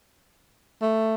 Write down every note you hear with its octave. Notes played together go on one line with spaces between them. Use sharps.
A3